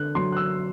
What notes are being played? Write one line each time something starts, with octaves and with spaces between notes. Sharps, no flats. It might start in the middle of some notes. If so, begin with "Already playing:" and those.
Already playing: D3 F#6
F#3 C6
F#6
E6